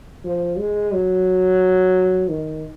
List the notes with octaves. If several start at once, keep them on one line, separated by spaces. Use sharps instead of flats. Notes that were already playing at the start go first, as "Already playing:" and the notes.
F3
G#3
F#3
D#3